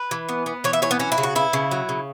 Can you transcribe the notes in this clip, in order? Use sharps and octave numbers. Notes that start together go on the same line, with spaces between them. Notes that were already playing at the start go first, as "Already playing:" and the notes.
Already playing: B4
E3
B3
B3
E3 C#5
E5
E3 C#5
B3
F#3 C#4
E4
C#3
F#4
B3 E4
C#3
F#3
C#3